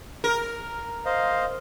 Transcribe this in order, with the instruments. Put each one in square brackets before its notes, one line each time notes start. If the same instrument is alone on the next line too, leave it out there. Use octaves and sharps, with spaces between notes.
[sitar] A#4
[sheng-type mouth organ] C5 D#5 F5